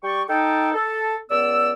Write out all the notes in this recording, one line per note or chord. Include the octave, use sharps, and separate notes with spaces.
G3 D5 G5 C#6
D#4 A4 G5
A4
C#2 B3 D5 E6